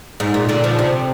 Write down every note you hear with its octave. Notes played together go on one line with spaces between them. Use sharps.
G#2
A#2
A#2 D3
D3 F3
C3